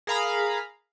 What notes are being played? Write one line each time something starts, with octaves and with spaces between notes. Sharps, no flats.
G#4 A#4 F5 A#5 B5